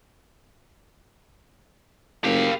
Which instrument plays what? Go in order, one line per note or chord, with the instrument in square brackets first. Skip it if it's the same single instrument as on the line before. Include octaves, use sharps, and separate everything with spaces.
[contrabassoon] F#1 [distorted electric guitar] G4 F5 [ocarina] A#4